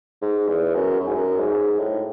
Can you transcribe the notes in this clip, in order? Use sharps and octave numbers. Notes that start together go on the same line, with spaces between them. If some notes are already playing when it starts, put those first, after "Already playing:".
G#2
E2
F#2
F#2
G#2
F#2
G#2
A2